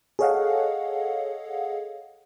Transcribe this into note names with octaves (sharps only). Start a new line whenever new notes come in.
G#4 A4 C#5 D#5 F5 F#5